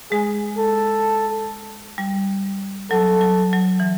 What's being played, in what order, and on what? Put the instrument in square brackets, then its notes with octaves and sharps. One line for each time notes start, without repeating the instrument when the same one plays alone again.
[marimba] G#3 [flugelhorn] G#4
[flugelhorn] A4
[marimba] G3
[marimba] F#3 [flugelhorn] A4
[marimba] F#3
F#3
E3